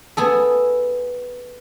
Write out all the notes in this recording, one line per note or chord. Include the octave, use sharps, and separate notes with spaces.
B3 G#4 A4